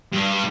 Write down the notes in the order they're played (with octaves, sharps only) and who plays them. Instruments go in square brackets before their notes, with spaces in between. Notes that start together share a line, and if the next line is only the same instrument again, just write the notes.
[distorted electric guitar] G2